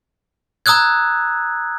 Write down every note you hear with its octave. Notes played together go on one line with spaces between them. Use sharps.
A#5 D#6 E6 F#6 G#6